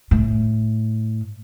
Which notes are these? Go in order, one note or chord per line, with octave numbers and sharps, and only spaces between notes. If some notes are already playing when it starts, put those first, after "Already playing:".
A2